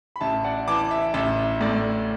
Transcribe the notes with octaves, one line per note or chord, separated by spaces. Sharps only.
B5
A1 E5 A5
D5 F#5
E3 A5 D6
E5
A1 E5
A2 D5